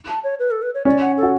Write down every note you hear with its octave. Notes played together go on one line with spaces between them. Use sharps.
A5
C#5
B4
A4
B4
C#5
C#4 D5
F#5
A4
F#4